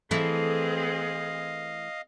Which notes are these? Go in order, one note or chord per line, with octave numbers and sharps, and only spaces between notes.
E3 A3 C4 E4 G#4 D#5 F5